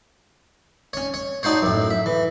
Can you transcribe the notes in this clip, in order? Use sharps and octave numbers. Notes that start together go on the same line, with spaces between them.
C#4 C#5
C#5
D4 D#4 F#4 C5 C#5
F#2 A2
E5
E3